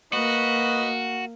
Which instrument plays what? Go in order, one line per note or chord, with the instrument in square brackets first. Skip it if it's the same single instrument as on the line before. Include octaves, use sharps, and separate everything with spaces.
[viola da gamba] A#3 [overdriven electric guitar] F#4 [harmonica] B4 D#5